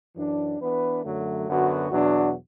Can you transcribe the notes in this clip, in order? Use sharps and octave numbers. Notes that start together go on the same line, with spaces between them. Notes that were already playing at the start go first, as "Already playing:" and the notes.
F#2 E3 D4
E3 B3 D4 B4
F#2 D3 F#3 A3
F#2 D3 B3 F#4
E2 B2 F#3 D4 F#4